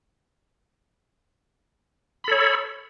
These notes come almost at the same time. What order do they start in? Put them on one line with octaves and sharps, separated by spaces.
B5 A4 C#5